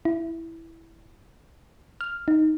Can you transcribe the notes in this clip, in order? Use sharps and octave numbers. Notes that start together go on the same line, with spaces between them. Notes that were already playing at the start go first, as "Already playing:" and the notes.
E4
F6
D#4